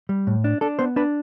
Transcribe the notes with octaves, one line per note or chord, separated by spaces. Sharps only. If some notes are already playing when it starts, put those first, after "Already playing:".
G3
A2
D4
D4 A4
B3 C5
D4 B4